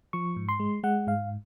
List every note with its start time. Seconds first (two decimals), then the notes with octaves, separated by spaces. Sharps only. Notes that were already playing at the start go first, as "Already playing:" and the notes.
0.13 F3 C#6
0.36 G#2
0.49 C6
0.60 G#3
0.83 G#3 F#5
1.07 G#2 F5